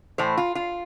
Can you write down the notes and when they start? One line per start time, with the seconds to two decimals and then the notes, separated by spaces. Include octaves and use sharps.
0.18 A2 E3 A3 C5
0.37 F4
0.55 F4